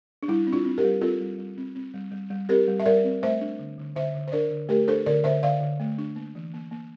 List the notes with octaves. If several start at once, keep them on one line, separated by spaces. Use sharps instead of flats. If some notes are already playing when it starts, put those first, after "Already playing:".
D4
G3 E4
C4
D4 F4
C4
G4 A#4
G3
C4 F4 A4
G3
G3
C4
C4
G3
G3
G3
C4 G4 A#4
G3
E5
G3 A#4 D5
C4
A3 C5 E5
D4
D3
D3
D3 C5 E5
D3
C5
D4 A#4 D5
D3
A3 G4 A#4
D4 A4 C5
D3 A#4 D5
D3 C5 E5
D3 D5 F5
D3
A3
D4
A#3
E3
A#3
A#3